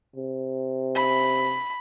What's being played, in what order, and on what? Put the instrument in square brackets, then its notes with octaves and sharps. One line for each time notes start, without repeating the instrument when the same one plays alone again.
[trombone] C3
[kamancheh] B5